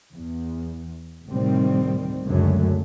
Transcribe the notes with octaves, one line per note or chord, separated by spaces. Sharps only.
E2
D2 A2 C3 D#3 G3 C4
C#2 F#2 D3 F#3 A3